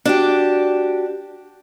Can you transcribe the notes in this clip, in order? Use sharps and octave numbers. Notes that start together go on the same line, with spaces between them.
D4 F#4 G4